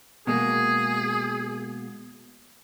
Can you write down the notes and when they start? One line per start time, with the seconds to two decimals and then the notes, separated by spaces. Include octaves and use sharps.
0.27 B2 G#3 A#3 G#4